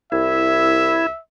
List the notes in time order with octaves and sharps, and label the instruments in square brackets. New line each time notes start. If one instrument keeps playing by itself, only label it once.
[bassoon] C2 [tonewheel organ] E4 [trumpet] E5